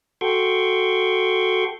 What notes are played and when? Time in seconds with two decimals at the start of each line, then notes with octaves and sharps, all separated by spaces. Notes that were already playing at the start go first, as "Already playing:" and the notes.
0.21 F#4 A4 G5 C6 C#6